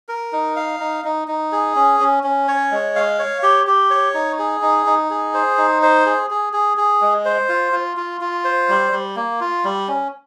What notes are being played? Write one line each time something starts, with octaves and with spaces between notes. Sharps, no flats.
A#4
D#4
F5
D#4
D#4
D#4
G#4
C#4
C#4
C#4
C#5
G#3
F5
C#5
G4
G4
C#5
D#4
G#4
D#4
D#4
G#4
C5
D#4
C5
G#4
G#4
G#4
G#4
G#3
C5
F4
F4
F4
F4
C5
G3
G3
A#3
F4
G3
C#4